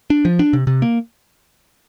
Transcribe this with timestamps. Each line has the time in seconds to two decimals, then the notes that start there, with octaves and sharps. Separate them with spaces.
0.10 D4
0.25 F3
0.39 D4
0.53 C3
0.67 C3
0.82 A#3